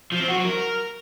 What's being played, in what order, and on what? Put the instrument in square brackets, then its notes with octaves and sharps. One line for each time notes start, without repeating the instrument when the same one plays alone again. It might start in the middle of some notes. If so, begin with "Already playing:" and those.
[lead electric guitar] F3
C4
F#4
F#3
A#4